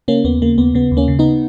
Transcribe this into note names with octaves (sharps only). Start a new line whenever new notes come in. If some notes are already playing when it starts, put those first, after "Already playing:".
C#3 A#3 C#4
D#2 B3
C#3 A#3
D#2 B3
C#3 B3
D#2
A#3 C#4
C#3
B3 D#4